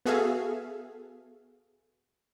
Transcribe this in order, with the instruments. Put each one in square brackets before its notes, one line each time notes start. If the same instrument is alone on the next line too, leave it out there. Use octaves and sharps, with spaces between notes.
[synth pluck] B3 F#4 G#4 A4 E5 F5